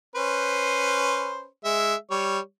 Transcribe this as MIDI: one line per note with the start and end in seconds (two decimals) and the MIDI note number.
0.15 1.46 61
0.15 1.46 71
0.15 1.46 72
1.64 1.95 56
1.64 1.95 76
2.10 2.39 55
2.10 2.39 73